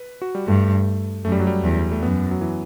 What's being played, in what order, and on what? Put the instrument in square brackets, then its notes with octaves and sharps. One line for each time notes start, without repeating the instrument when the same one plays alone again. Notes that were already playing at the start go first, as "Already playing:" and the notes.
Already playing: [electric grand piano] B4
F#4
G3
[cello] G2 [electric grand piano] A3
[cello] F#2 [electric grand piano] A3
[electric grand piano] G3
F#3
G3
[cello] E2
[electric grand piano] A3
[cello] F#2 [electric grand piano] B3
[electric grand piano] F#3
E3